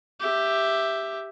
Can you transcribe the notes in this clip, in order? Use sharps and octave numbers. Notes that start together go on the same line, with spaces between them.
G4 E5